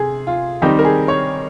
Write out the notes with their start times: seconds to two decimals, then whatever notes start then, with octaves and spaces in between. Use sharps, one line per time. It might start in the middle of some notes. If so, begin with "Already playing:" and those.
Already playing: C3 G#4
0.27 F4
0.62 D#3 G3 C4 D#4 G4
0.79 A#4
0.85 G#4
1.08 C#5